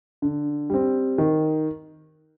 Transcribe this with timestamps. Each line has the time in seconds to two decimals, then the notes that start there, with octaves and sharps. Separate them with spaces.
0.22 D3
0.70 G3 C4
1.18 D#3